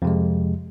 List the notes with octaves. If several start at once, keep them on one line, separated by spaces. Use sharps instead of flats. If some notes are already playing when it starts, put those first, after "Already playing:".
F2 C3 G#3